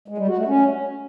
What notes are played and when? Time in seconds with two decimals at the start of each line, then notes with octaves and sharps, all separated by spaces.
0.08 G#3
0.18 G3
0.28 F#4
0.37 A3
0.47 C#4